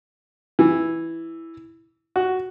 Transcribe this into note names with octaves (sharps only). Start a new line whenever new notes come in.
E3
F#4